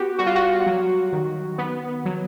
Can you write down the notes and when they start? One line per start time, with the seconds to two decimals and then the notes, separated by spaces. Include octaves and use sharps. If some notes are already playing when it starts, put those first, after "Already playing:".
Already playing: B3 F#4 G4
0.18 G3 F#4
0.26 F4
0.36 F#4
0.66 F#3
1.13 D#3
1.58 B3
2.05 F#3